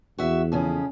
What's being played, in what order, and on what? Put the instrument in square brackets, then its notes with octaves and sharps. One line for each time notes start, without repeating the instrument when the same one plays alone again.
[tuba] E2 [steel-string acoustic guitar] F#4 E5
[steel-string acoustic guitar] F2 C#3 C#4